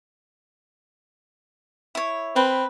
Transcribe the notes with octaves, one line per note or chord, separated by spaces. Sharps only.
E4 C#5
C4 B4 B5